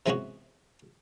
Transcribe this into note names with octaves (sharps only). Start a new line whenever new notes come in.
C3 E3 G#3 B3 C#4 F#4